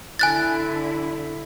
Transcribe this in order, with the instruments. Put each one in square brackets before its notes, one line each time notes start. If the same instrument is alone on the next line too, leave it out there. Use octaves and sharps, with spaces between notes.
[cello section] D3 E4 [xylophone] G#5 F#6 A6